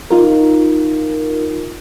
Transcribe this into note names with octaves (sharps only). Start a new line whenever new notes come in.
D#4 F4 A#4